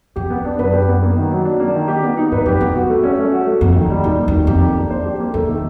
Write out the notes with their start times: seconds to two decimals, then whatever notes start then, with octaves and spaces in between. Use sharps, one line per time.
0.16 F2 G4
0.30 B3
0.45 D4
0.59 F#2 B4
0.73 G4
0.88 B3
1.02 A#3
1.17 D#3
1.31 F#3
1.45 D4
1.60 A#3
1.74 D#3
1.88 G4
2.03 B3
2.17 D#4
2.32 G#2 B4
2.46 F2 G4
2.61 E2 B3
2.75 F#4
2.90 A3
3.04 C#4
3.18 A3
3.32 F#4
3.47 A3
3.61 F2 A#3
3.76 D#3
3.90 G3
4.04 E2 D#4
4.19 A#3
4.28 E2
4.33 D#3
4.47 F2 G4
4.62 A#3
4.77 D4
4.90 C5
5.05 G4
5.19 A#3
5.34 E2 A3
5.48 D#3